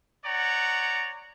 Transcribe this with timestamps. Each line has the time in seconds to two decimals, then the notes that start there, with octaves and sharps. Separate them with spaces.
0.25 C#5 D5 F#5 A#5